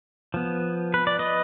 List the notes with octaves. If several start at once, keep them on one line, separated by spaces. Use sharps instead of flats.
F3 B3
B4
D5
B4 D#5